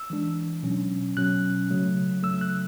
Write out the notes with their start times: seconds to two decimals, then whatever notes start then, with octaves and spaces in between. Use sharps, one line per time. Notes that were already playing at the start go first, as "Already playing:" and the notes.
Already playing: E6
0.10 E3 G#3 D4
0.63 B2 F#3 C#4
1.17 B2 F#3 C#4 F#6
1.70 C#3 F#3 A3
2.23 C#3 F#3 A3 E6
2.41 F#6